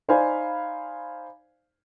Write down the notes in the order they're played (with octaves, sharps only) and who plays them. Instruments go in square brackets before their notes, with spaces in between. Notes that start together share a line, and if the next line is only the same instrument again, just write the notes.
[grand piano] D#4 C5 D5 F5 G#5 B5